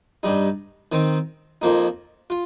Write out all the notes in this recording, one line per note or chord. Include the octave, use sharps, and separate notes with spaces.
G2 G3 D#4
D#3 C4 D#4
F2 F3 A#3 D#4
F4